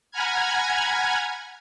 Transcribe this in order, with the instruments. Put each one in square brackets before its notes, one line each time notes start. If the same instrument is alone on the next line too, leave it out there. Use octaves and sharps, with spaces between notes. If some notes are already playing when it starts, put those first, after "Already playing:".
[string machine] F#5 G#5 A#5 B5 F6 G#6